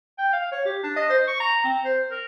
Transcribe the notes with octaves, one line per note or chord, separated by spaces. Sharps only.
G5
F5
C#5
G4
D4
D#5
C5
C#6
A#5
C4
C5
A#4